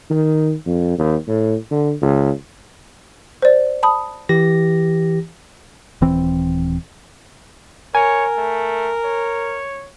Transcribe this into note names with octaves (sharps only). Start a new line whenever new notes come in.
D#3
F2
D#2
A2
D3
C#2
C5 D5
A5 B5 D#6
E3 G4 A#6
D#1 E3 C4
A#4 C#5 G#5
A3
C#5